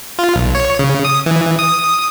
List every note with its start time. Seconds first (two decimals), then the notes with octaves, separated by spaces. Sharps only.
0.19 F4
0.35 B1
0.55 C#5
0.79 C#3
1.05 D#6
1.26 E3
1.59 D#6